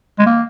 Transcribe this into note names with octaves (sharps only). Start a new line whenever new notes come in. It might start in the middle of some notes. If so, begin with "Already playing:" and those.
G#3
A#3